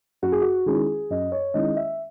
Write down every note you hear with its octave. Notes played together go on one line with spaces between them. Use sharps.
F#2 F#4
G#4
F#4
D#3 G#3 C#4 E4 G#4
F#2 D#5
C#5
D#3 G#3 C#4 E4 D#5
E5